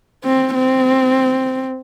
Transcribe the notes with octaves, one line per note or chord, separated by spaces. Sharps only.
C4
C4